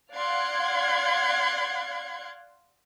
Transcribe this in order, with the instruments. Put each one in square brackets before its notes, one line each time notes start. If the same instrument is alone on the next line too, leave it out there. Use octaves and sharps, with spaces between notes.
[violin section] D5 F5 F#5 C6 F#6 G#6